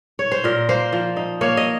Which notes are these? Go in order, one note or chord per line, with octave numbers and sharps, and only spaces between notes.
C#5
C5
A#2 A#4
A#3 C5
F3
D#4
A#3 C#5
D#5